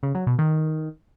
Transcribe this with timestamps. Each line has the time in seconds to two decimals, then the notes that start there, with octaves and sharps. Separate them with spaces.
0.03 C#3
0.15 F#3
0.27 B2
0.39 D#3